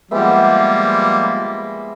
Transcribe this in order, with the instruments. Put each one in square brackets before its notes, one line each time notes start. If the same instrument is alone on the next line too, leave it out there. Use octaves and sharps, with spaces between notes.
[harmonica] F3 G3 A#3 [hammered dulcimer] G#3 B3 E5
[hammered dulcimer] B5